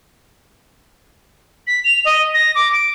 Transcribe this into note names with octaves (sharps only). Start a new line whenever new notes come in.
B6
F7
D#5
A#6
D6
D7